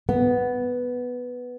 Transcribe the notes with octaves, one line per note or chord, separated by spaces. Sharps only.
B3